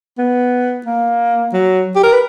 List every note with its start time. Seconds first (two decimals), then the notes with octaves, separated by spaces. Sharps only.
0.18 B3
0.86 A#3
1.53 F#3
1.95 G4
2.03 A#4
2.12 B4